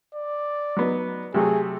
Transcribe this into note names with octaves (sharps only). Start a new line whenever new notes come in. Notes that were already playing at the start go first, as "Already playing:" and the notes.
D5
F#3 B3 D#4
C3 F#3 A3 G#4